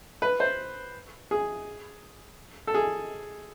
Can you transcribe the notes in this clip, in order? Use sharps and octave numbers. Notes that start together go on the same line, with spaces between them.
B4
C5
G#4
A4
G#4